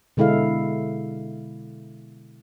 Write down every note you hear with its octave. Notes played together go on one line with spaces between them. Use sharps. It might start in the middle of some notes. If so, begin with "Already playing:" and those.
B2 D3 G#3 E4 A4 F5